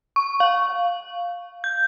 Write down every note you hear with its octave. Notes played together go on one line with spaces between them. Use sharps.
C#6
F5
G6